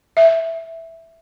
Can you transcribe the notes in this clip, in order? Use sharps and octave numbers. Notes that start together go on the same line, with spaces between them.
E5